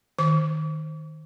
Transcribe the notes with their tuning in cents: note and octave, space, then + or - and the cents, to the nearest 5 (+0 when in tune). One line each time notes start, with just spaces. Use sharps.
D#3 +0 D6 -45